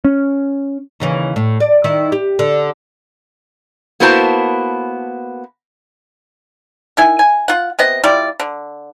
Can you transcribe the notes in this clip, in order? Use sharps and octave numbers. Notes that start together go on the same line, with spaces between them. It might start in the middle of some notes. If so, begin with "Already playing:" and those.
C#4
D#2 C#3 E3
A2
D5
D#3 E4
G4
D3
A#3 B3 E4 F#4 C5 A5
D#3 E4 G#5
G#5
F4 F#5
C3 B3 D#5
G3 E4 F4 D5
D3